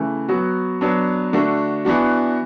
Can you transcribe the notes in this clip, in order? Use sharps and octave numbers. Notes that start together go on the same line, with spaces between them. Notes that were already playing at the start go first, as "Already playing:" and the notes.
Already playing: C#3 E3 A3
F#3 B3 F#4
F#3 B3 D4
D3 A3 D4 F#4
E3 B3 D4 F#4